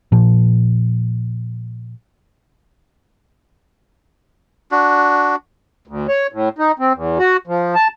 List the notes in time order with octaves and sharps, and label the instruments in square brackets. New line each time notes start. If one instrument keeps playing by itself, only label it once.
[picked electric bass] A#2 F3
[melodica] D4 F#4
[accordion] D2
C#5
A2
D#4
C4
E2
F#4
F3
A5